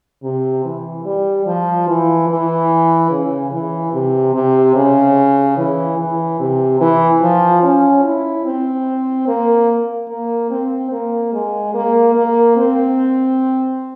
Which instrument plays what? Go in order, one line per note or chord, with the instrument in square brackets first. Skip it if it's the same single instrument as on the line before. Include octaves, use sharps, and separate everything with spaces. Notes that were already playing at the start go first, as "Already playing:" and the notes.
[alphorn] C3
E3
G3
F3
E3
E3
C#3
E3
C3
C3
C#3
E3
E3
C3
E3
F3
C#4
E4
C4
A#3
A#3
C4
A#3
G#3
A#3
A#3
C4